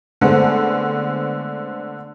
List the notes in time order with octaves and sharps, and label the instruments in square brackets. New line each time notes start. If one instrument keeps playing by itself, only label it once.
[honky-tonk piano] D3 G#3 A3 B3 C4